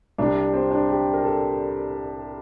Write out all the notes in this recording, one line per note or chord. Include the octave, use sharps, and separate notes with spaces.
C2 C3 G3 D4
C4
D4
G4
A#4
A4